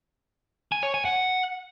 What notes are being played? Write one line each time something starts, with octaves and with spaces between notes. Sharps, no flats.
G#5
C#5
G#5
F#5